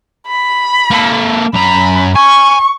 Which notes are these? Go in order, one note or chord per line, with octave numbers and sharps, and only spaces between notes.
B5
A#3 A4
F#2 A#5 B5
G#5 C#6